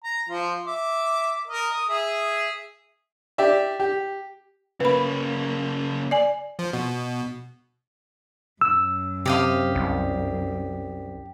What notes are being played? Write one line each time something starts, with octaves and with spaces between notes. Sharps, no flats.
A#5
F3 F4
E5 D6
A#4 D#5
D#6
G#4 E5
G4 D5 E5
G4
C#3 A#3 B4 B5
D5 G#5
F3
B2
F#2 E6
C3 G4 D#5 F5
C2